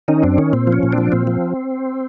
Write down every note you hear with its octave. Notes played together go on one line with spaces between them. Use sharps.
D#3 C#4 D#4
F#2 C4 D4
D#3 C#4
A#2 C4
F3
C#4
A#2
C4 D4
F3
A#2 C4
F3